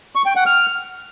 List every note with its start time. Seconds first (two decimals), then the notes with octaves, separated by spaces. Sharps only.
0.15 C#6
0.26 G5
0.36 F#5
0.46 F6